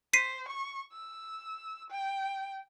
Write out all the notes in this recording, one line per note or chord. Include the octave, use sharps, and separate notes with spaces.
C5 B6 C7 D#7
C#6
E6
G5